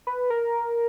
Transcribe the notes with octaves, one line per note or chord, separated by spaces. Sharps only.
B4
A#4